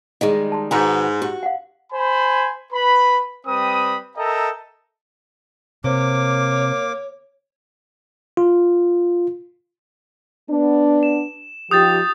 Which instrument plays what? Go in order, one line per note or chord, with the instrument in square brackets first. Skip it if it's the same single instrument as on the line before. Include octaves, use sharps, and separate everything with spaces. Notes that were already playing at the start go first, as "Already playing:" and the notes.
[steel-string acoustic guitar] D#3 G3 G#3 [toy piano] G#4 D#5
[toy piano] A5 C6
[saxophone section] G#2 [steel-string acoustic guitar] D#3 F#4 B4 [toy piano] G#5
[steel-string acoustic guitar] F#4 [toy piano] G4
[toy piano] F5 F#5
[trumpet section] C5 G#5 B5
B4 B5
G3 C4 B4 B5 D#6
A4 A#4 D#5 E5 G5 A#5
[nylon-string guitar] C3 [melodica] A#3 D6 [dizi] C#5
[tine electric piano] F4
[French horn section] B3 D4
[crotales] E7
[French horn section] F3 D#4 G4 [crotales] D#6 G6 A6